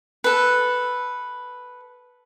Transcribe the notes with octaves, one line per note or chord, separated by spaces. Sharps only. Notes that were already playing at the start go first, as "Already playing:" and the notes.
A4 B4